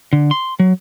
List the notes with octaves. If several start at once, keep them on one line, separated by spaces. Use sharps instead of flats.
D3
C6
F#3